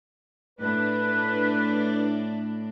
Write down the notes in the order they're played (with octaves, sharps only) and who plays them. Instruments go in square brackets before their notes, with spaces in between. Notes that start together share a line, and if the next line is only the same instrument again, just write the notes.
[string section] A2 D4 [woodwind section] B4